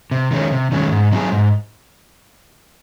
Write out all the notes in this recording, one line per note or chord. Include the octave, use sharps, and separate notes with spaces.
C3
D#3 G#3 C#4
C3
D#3 G#3 C#4
G#2
F#3 C4 D#4 G#4
G#2